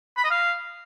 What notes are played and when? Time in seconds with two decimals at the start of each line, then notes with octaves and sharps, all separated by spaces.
0.17 B5
0.24 D#5
0.31 F5